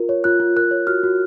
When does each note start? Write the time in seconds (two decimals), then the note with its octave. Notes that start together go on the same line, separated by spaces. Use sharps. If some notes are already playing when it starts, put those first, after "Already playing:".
Already playing: F4 A#4
0.09 C#5
0.24 F4 F#6
0.40 F4
0.57 A#4 F#6
0.71 C#5
0.87 F#4 F6
1.03 F#4